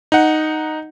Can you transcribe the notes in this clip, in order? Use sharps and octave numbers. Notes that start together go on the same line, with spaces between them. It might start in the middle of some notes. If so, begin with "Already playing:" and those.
D#4 F#5